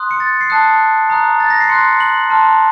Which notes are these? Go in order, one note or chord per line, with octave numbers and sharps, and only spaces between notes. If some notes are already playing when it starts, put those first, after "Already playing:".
Already playing: C6 D#6 F#6
C#7
A6
C7
A5 D#6 F#6 C#7
A#5 D#6 F#6
A6
A#6
C7
C6 F#6 C#7
F#7
A5 C6 F6